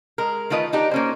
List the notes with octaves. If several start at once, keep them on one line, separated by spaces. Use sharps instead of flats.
G#3 A#4
D#3 A3 F4 B4 D#5
D4 D#4 G4
A#3 C#4 C5